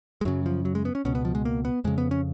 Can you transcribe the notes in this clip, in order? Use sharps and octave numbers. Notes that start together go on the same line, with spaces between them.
G#3
F#2 C#3 F#3
F3
F#3
G#3
B3
C#4
C#2 B2 C#4
B3
F3
G#3
A#3
B3
F2 C#3 G#3
B3
C#4